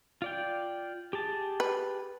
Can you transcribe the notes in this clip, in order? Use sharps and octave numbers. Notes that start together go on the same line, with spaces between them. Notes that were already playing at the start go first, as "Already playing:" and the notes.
F4 D5 G5
G4 G#4 A5
B4